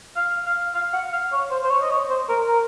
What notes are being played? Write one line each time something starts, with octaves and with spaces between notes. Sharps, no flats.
F5
F5
F5
F#5
F5
C#5
C5
C5
C#5
D#5
C#5
C5
A#4
A#4